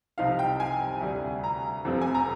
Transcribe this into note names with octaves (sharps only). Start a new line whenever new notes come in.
C2 C3 F3 C4 D#4 F5
G5
G#5
D2 C3 G3
A#5
F1 F2 C3 F3 C4
G#5
A#5